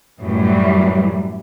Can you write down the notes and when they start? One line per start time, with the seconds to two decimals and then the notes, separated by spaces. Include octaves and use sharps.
0.19 F#2 A2 E3 F#3 G3